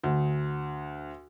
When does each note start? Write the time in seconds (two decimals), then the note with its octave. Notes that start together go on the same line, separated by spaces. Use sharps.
0.04 D2